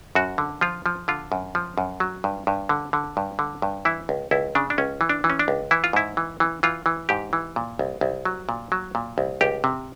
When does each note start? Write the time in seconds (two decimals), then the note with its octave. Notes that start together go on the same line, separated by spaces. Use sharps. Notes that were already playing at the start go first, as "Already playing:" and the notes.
0.15 F#2 F#4
0.38 D3
0.61 F3 F4
0.86 F3
1.08 D3 F4
1.32 F#2
1.55 F3
1.78 F#2
2.00 F#3
2.24 G2
2.47 G2
2.69 D3
2.93 D3
3.17 G2
3.39 D3
3.62 G2
3.85 E3 E4
4.09 C#2
4.31 C#2 E4
4.55 C#3 D4
4.70 D4
4.78 C#2 C#4
5.01 E3
5.09 D4
5.24 E3
5.30 C#4
5.39 D4
5.48 C#2
5.71 E3 E4
5.84 F4
5.93 G#2 E4
6.17 E3
6.40 E3
6.63 E3 F4
6.86 E3
7.09 G#2 G4
7.33 E3
7.56 A#2
7.79 C2
8.01 C2
8.25 F#3
8.49 A#2
8.72 F#3
8.95 A#2
9.18 C2
9.41 C#2 G4
9.64 C3